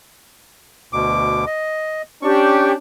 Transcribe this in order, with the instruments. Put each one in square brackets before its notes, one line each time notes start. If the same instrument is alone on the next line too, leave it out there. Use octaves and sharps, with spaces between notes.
[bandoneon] D2 B2 D6
D#5
[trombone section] C#4 D4 [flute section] G4 [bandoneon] C#6